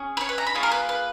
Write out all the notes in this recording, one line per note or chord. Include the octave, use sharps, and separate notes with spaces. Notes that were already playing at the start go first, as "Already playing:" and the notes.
Already playing: C#4 G#4
B4
C#5
B4
A#5
B5
A#3 F4 G#4 C#5
A#4
B4
B4